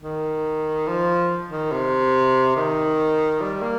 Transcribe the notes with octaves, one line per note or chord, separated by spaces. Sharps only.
D#3
F3
D#3
C3
D#3
G3
A#3